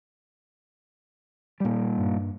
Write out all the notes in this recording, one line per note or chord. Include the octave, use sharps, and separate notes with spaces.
A#2 G3
G2